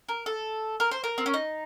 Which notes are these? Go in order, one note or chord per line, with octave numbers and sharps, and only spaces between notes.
A#4
A4
A#4
C5
A#4
C4
C#4
D#4